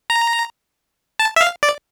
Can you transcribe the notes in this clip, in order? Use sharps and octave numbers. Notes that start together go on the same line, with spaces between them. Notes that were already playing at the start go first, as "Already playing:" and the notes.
A#5
A5
E5
F5
D5